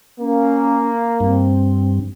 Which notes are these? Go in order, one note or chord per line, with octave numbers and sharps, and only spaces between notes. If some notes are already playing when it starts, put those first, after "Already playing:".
A#3 C#4
G2 C4